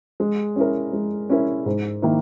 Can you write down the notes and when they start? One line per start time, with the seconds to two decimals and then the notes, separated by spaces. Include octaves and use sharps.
0.20 G#3
0.56 C#4 E4 A#4
0.93 G#3
1.30 C#4 E4 A#4
1.66 G#2
2.02 D#3 A#3 E4